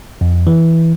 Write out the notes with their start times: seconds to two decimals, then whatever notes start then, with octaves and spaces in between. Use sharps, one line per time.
0.21 F2
0.47 E3